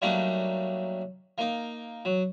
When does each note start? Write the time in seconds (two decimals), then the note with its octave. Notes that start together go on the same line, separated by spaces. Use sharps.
0.02 F#3 G3 A3 A#3 D4 D#4
1.38 A#3 D#4
2.05 F#3